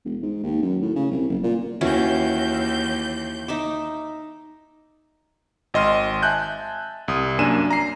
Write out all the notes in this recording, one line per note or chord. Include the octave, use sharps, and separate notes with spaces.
E1
G#2
D#2
F#2
A2
C#3
C2
F#1
A#2
D#2 E3 C#4 F#4 G6
D#4 E5 D6
G#1 D#5 C6 F6
E5 G#5 A5 F#6 G6
C2 D#6
F#2 A#3 D4 G#5 D#7 E7
A#5 C7